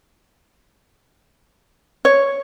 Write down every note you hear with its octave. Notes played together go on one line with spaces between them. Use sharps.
C#5